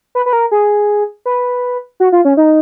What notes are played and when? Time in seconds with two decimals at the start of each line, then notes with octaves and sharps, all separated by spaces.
0.15 B4
0.26 B4
0.33 A#4
0.51 G#4
1.26 B4
2.00 F#4
2.12 F4
2.25 C#4
2.37 D#4